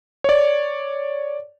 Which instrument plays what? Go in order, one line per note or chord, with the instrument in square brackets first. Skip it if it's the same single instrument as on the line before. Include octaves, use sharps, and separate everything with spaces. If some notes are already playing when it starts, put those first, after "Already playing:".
[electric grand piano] C#5 D5